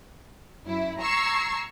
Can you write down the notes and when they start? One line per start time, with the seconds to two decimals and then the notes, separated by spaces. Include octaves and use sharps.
0.66 F#2 E4
1.00 A#5 C#6 E6 G#6 C7